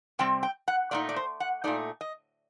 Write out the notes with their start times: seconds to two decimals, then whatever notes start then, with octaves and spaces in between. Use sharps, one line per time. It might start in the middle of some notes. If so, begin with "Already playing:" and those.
0.19 C3 G3 C4 G5
0.43 G5
0.68 F#5
0.91 A#2 A3 D#4 D5
1.09 D5
1.16 C5
1.40 F#5
1.64 A#2 A3 D#4 D5
2.01 D#5